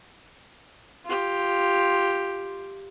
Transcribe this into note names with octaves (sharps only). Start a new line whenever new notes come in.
F4 G4